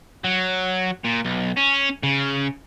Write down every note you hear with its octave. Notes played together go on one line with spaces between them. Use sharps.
F#3
A#2
B1
C#4
C#3